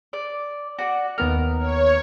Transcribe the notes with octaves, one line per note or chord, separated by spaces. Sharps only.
D5
F#4 D5
D#2 B3 A#4 F6
C#5